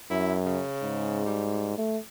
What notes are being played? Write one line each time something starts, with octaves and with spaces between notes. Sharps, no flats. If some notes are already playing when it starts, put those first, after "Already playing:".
F#2 E4
C#3
G#2
G3
A3